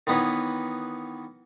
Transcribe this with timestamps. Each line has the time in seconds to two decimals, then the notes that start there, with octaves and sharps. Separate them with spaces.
0.07 D#3 E3 B3 D#4 B4 C#5